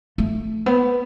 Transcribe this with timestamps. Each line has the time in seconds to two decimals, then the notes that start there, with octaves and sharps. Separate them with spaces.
0.18 A3
0.66 B3